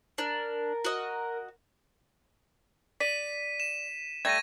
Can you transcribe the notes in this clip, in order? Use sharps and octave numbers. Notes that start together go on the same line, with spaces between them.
D4 A#4
F#4 D#5
D5 B6 D#7
E7
G3 A3 G#6 A#6 D#7